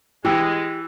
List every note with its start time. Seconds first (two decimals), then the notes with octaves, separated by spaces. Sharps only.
0.25 E3 G#3 G4